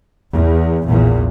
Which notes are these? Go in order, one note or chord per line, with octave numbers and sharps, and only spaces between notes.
E2
A#1 E2 A#2